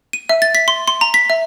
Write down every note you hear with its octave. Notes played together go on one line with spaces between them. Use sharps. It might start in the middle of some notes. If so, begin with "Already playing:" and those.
D#7
E5
A6
B6
C6
C6
A#5
B6
E5